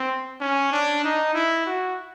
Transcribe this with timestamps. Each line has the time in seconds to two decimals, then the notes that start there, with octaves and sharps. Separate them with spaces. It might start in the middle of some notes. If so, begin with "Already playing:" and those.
Already playing: C4
0.41 C#4
0.72 D4
1.04 D#4
1.34 E4
1.66 F#4